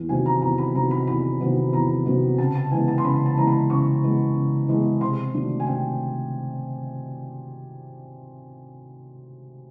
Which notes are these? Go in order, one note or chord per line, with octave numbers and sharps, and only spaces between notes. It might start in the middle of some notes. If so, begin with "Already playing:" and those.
Already playing: E2
C3 D#3 F#3 B3 G#5
A#5
E2 A#5
B5
C3 D#3 F#3 B3 A#5
B5
E2 B5
C3 D#3 F#3 B3
E2 A#5
C3 D#3 F#3 B3
C#3 A5
A5
E3 G#3 B3 G#5
A5
C6
C#3 B5
A5
E3 G#3 B3 A#5
B5
C#3 C#6
E3 G#3 B3
C#3
E3 G#3 B3
C3 C6
D#3 F#3 A3 D4
G#5
C3 G5